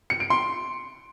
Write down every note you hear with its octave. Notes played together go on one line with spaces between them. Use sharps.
C#7
D7
C6